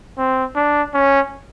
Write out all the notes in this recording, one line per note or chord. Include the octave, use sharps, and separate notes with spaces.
C4
D4
C#4